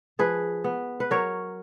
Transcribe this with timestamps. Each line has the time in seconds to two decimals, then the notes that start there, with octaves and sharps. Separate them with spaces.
0.19 F3 G#4 B4
0.64 B3
1.00 B4
1.11 F#3 A#4 C#5